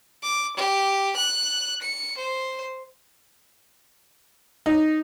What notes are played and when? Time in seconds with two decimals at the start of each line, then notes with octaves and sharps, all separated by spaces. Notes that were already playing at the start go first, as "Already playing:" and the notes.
0.23 D6
0.57 G4
1.16 F#6
1.82 C#7
2.18 C5
4.66 D#4